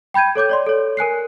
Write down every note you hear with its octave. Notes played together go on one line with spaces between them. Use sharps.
G5 B5 G6 G#6 D#7
A4 C#5 D6 G6
C#5 D5 C6
A4 C#5
A#4 G#5 F#6 C7